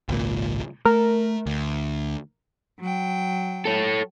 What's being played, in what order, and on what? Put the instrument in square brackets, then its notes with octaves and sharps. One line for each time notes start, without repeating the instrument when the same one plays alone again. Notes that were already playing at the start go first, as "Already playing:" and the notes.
[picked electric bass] G#1 C#2 A#2
[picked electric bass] A3 [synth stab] A#4
[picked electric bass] D2
[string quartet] F#3 G5
[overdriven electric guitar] A4 C#5